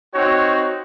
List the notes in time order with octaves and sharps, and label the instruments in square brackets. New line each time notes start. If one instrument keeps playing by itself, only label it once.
[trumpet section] C4 D#4 F#4 C#5